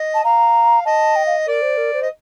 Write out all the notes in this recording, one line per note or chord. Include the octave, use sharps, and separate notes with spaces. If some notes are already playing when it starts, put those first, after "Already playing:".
Already playing: D#5
A5
F5 A#5
D#5 A5
G5
F5
A#4 D5
C5
A#4
C5
D#5